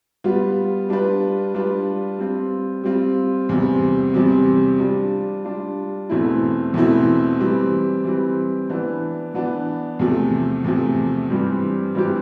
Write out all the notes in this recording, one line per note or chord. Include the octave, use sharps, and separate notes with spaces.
G3 B3 F4
G3 D4 F4 B4
G3 D4 F4 B4
G3 C4 F4
G3 C4 F4
E2 C3 G3 C4
E2 C3 G3 C4
G3 D4 F4
G3 D4 F4
E2 B2 A3 C4 E4
E2 B2 A3 C4 E4
E3 G3 C4
E3 G3 C4
E3 B3 D4
E3 B3 D4
E2 C3 F3 A3
E2 C3 F3 A3
G2 E3 G3 C4 G4
G2 E3 G3 C4 G4